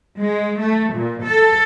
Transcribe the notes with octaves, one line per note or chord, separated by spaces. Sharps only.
G#3
A3
A#2
A4